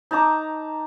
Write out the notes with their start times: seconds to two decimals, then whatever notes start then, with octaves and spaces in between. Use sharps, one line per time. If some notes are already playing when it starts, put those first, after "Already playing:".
0.11 D#4 A5 A#5 D6